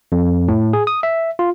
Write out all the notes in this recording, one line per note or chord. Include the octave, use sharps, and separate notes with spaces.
F2
A2
G#4
D#6
E5
F4